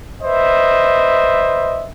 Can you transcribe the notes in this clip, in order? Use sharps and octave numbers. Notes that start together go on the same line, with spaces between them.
B4 C5 D#5 E5